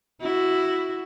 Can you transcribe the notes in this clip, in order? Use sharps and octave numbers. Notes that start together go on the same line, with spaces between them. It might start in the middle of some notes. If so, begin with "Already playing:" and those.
E4 F#4